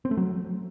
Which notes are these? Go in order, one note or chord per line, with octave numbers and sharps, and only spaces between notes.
C4
A3
F#3